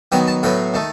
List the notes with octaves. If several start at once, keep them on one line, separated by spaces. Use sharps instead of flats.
D#3 F#3 B3 G5
A5
A2 F#3 B3 G5
D#3 A3